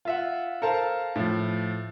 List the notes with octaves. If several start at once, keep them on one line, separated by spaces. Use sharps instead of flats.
F4 E5 F#5
A4 A#4 C5 F5 A5
A2 F3